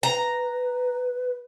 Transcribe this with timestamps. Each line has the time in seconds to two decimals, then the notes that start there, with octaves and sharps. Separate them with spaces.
0.03 B4 A#5